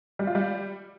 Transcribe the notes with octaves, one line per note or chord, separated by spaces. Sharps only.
G3
F4
G3